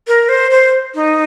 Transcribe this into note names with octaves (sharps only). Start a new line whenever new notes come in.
A#4
C5
C5
D#4